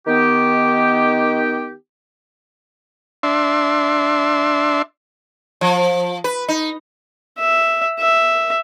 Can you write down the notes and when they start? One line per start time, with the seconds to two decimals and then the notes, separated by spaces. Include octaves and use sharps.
0.07 D#3 B3 G4
3.23 D4 E5 C6
5.61 F3
6.24 B4
6.48 D#4
7.38 E5
7.99 E5